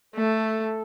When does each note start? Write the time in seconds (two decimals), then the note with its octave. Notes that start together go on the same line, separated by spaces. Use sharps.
0.14 A3 A4